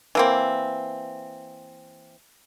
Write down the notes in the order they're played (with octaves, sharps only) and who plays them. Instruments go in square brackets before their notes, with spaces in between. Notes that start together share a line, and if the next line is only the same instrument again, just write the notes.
[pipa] E3 A#3 C4